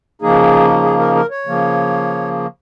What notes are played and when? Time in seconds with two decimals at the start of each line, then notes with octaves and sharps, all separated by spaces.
0.22 C#3 F3 A#3 D#4 G#4
0.84 G#4
1.00 A#4
1.15 A#4
1.31 C#5
1.47 C#3 F3 A#3